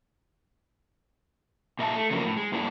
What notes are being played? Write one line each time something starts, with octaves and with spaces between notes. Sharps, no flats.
A#2 D#5 E5 A5
A3
C#3 F3 F#3 A#3 D4
A2
G#3
G2 D3 A#3 D4 E4